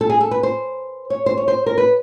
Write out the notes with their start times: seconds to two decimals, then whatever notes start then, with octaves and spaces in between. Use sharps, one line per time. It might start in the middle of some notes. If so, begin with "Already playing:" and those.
0.01 A4
0.10 G#4
0.21 A4
0.31 B4
0.43 C5
1.10 C#5
1.26 C5
1.37 C#5
1.48 C5
1.66 A#4
1.78 B4